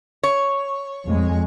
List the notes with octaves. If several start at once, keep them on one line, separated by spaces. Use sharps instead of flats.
C#5
F2 G#3